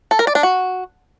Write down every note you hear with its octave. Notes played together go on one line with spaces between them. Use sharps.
A4
A#4
D5
D4
F#4